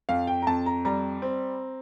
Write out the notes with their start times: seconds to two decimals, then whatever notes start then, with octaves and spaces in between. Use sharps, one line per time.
0.09 F2 F5
0.27 G5
0.42 A#5
0.47 F2 A5
0.66 A#5
0.85 G3 A#5
1.22 C4